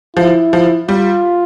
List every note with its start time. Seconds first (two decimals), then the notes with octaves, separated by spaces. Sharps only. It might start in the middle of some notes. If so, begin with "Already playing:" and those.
0.16 F3 E4
0.53 F3
0.89 G3 F4